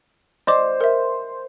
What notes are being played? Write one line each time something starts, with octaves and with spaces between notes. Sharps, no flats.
C5 D5 D#5 D6
A#4 E5